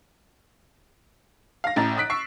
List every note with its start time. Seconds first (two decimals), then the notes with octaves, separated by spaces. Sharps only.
1.64 F5 A#6
1.76 A1 A2 A#5 A6
1.97 D#6 F#6 B6 D7
2.10 C#6 E6 C7